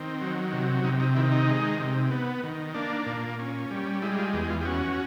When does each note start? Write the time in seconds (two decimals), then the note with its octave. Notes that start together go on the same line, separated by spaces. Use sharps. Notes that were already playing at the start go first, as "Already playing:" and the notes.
Already playing: D#3 C4
0.21 F#3
0.53 C3
0.84 C3 D#4
1.00 D#4
1.16 D#3 E4
1.32 D#4
1.48 G#3
1.80 C3
2.11 B3
2.44 D#3
2.74 A#3 D4
3.06 A#2
3.39 C#4
3.71 G3
4.02 G#3 E4
4.19 F4
4.34 E2 G4
4.50 F4
4.61 G4
4.65 C#4 F#4